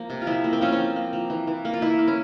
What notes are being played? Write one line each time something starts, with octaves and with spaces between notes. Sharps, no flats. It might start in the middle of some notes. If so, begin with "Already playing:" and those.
Already playing: F3 A#3
C3
F4
F3 E4
A#3
C4
F3 C#4
C4
F3
A#3
F3
E3
E3
A#3
F4
E3 E4
A#3
C#4